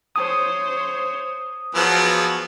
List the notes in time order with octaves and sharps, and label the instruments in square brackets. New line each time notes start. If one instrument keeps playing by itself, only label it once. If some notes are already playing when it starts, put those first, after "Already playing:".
[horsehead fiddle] C5 C#5 [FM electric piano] D#6
[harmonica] F3 F#3 B3 [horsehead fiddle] F#4 G#4